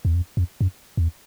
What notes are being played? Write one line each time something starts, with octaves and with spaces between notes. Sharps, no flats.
E2
F2
F2
F#2
E2